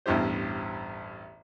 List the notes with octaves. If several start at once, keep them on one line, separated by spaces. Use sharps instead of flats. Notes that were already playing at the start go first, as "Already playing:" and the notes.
A1 E2 G2 E4 G4 C5